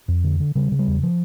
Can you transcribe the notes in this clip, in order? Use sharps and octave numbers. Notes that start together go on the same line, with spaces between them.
F2
D3
D3
C#3 G3
C#3
G3
E2
F3